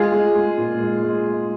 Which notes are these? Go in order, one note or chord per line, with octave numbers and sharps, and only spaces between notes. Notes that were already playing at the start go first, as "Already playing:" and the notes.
Already playing: G#3 F4 G#4
G#3
G#3
A#2
G#3
G#3
G#3